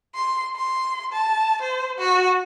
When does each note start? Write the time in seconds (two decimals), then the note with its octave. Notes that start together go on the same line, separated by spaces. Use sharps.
0.15 C6
0.56 C6
1.13 A5
1.62 C5
1.98 F#4